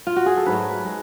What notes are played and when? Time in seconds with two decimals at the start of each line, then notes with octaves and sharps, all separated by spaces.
0.07 F4
0.16 F#4
0.26 G#4
0.37 A4
0.46 G#2 F#3 A3 B4
0.85 G#3